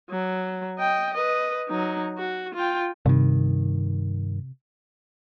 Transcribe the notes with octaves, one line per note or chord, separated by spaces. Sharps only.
F#3
D#5 G5
B4 D#5
F#3 D#4
F#4
F4 G5
G2 C3 D#3